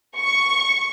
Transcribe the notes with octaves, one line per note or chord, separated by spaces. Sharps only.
C#6